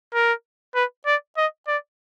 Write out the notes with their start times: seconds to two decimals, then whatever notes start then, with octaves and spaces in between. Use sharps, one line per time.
0.14 A#4
0.75 B4
1.06 D5
1.37 D#5
1.68 D5